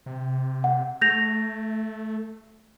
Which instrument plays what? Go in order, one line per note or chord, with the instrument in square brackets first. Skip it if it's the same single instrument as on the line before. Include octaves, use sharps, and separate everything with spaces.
[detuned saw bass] C3
[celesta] F#5
[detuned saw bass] A3 [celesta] G6 A#6 F7